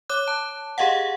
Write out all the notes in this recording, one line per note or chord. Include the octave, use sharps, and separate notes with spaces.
C#5 D6 F#6
A5
G4 G#4 D#5 F5 F#5